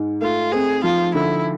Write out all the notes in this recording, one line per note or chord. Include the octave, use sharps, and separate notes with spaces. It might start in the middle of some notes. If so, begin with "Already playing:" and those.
Already playing: G#2
A3 F4
C4 G#4
F3 F4
D3 E4